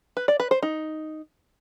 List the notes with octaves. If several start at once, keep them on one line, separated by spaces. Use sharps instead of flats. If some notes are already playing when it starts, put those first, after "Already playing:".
B4
D5
B4
C5
D#4